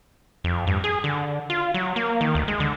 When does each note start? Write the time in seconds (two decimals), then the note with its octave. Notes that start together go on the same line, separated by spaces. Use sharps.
0.44 F2
0.67 G2
0.84 G#4
1.04 D3
1.50 F4
1.74 F#3
1.96 A#3
2.21 D#3
2.35 D2
2.48 G#3
2.60 D3